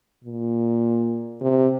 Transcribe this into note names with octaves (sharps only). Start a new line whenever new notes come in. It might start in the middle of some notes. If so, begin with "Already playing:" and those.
A#2
C3